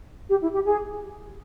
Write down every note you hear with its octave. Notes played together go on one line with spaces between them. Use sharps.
G4
E4
G4
G#4